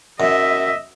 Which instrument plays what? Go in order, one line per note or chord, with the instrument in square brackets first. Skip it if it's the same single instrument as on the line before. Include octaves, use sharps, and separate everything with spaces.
[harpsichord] F#2 [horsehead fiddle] D#5 E5